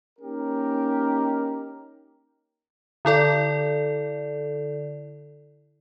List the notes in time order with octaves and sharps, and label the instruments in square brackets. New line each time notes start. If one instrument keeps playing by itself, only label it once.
[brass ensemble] A#3 C#4 D#4 G4 A#4
[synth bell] D3 E4 A4 D5